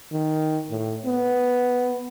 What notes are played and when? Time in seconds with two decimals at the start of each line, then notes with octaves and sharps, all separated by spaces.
0.13 D#3
0.70 A2
1.05 B3